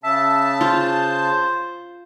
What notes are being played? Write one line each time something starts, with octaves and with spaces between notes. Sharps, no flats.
C#3 E5 A5
F4 C5